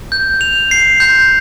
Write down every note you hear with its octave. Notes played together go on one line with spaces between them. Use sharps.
G6
F7
C7
G6